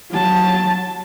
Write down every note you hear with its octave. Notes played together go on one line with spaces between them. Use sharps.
F#3 A5